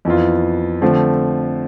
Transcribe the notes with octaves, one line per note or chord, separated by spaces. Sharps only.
F2 E3 B3 F4
D3 F3 A3 C4